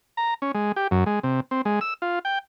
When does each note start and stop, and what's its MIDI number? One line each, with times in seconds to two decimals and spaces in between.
0.17 0.34 82
0.42 0.52 61
0.55 0.72 56
0.76 0.87 67
0.91 1.04 42
1.06 1.19 56
1.23 1.40 48
1.51 1.62 60
1.65 1.80 56
1.81 1.94 88
2.02 2.19 65
2.25 2.39 79